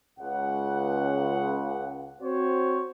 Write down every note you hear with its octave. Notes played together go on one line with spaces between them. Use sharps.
C#2 F#5
C4 F#4 C5 C#5